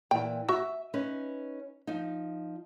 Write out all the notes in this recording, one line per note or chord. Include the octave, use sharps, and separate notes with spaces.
A#2 E3 G5
F#4 E5
C#4 D#4 B4
F3 D#4